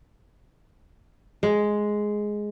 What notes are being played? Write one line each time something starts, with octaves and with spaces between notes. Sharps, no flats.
G#3